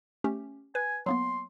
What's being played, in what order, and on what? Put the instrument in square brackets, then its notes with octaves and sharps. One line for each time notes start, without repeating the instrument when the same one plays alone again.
[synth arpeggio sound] A3 C#4 G4
[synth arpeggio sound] B4 [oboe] G#5
[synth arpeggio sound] F#3 A#3 B3 [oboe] C6